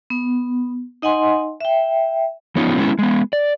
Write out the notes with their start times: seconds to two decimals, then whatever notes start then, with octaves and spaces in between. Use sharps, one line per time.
0.10 B3
1.02 D#4 D#5 F#5 G#5 C6
1.60 E5 G5
2.56 F3 B3 C#4 D#4 F4
2.77 F#3 G#3 B3 C#4 E4
2.99 G#3 B3
3.33 D5